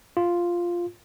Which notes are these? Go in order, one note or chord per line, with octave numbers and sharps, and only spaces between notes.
F4